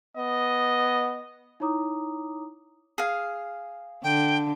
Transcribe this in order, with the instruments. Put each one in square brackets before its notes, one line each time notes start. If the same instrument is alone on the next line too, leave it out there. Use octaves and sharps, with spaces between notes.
[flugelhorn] B3 [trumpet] D#5
[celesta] D#4 E4 C#5 A#5 D6 D#6
[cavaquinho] G#4 F5
[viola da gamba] D3 [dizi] G5